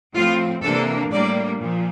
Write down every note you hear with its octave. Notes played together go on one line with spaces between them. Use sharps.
A2 F3 C4 F4
C3 E3 A#3 D4 A4
A2 G3 A#3 D4 D5
A#2 F3